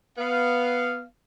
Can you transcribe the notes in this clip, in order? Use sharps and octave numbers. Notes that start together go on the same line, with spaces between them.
B3 F5